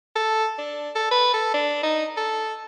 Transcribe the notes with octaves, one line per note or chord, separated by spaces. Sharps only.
A4
D4
A4
B4
A4
D4
D#4
A4